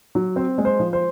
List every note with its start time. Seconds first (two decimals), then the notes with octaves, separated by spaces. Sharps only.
0.15 F#3
0.36 C4 C5
0.58 G#3
0.65 C5
0.79 F3
0.93 C5